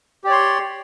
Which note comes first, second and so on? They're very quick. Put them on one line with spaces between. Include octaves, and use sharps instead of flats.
G4 D5 C#5 C6